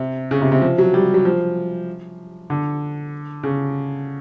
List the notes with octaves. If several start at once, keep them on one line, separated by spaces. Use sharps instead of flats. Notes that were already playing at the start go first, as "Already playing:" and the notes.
Already playing: C3
C#3
C3
C3
F3
F#3
G3
F#3
F3
D3
C#3